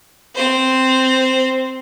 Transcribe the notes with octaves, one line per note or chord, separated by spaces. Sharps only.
C4 C5